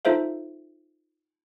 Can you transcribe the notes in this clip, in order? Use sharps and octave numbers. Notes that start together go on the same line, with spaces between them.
D#4 F4 A4 C5 E5 F5